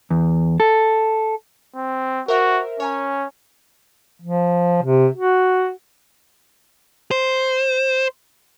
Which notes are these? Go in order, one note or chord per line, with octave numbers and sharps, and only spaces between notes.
E2
A4
C4
F#4 A#4 C5 E5
C#4 C#5 G#5 A#5
F3
C3
F#4
C5